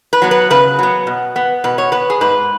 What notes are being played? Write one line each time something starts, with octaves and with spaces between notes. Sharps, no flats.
B4
F#3 B3
B4
C#3 B4
F#3 B3
B2
B3
B2 B4
C#5
B3 B4
G#4
G#2 B4